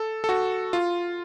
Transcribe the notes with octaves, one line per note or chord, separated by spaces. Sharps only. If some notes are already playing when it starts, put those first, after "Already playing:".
Already playing: A4
A4
F#4
F4